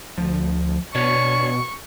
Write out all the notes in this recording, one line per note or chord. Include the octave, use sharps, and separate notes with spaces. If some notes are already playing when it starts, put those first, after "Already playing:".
D2 F3
B2 D4 C#5 C#6